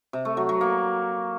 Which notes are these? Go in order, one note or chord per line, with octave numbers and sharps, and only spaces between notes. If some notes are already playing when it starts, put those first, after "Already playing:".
C3
A3
F#3
F#3
A#3